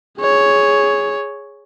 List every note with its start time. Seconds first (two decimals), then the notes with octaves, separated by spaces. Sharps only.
0.19 G#4 C#5